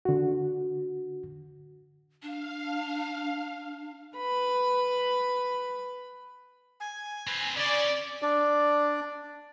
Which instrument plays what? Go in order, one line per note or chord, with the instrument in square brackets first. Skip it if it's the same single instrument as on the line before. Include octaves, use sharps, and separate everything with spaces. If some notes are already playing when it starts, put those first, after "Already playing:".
[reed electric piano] D3 F#4
[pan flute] D4 [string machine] F5
[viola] B4 B5
[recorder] G#5
[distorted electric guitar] C4 B4
[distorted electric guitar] C#3 [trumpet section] D5
[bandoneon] D4 D5